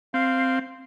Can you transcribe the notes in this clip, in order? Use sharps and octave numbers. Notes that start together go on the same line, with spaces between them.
C4 F5